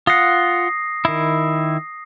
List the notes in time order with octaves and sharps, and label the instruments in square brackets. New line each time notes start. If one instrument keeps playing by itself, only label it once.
[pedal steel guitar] F4 F#5 [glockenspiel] D#6 A#6 C7
[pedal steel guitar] D#3 E4